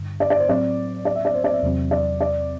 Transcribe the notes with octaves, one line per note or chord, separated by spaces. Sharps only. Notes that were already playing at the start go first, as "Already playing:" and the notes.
Already playing: G2 D3
D5
D5
C5
A2 F#3 C4 D5
D5
E5
D5
C5
D5
E5
E2 C3 F#3 C4
D5
D5